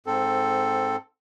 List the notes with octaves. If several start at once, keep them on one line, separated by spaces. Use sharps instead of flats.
G#2 C4 A4